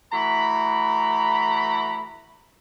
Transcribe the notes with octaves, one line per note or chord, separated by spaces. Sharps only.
E3 A3 F#4 A#5 B5